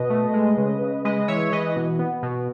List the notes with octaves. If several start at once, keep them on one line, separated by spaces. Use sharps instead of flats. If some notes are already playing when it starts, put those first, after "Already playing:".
Already playing: B2 B4 D#5
A3
G#3
C#3
C#3
G#3 B4 D#5
E3 C#5 E5
E3 B4 D#5
B2
B3
B2